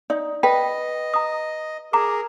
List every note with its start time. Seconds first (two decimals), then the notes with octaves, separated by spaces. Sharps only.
0.10 D#4 D5
0.43 B4 D#5 G5
1.14 A#5 D#6
1.93 G#4 A#4 A#5 D6